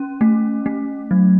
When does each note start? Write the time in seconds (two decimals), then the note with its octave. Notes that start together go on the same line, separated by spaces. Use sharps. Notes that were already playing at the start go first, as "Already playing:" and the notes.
Already playing: C#4
0.21 A3
0.66 A3
1.11 F#3